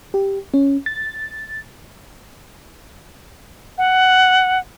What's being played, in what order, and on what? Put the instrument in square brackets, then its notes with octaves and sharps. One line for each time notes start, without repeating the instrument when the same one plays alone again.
[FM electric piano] G4
C#4
A6
[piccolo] F#5